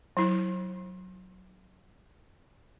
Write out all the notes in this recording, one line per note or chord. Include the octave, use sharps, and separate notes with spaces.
F#3 E4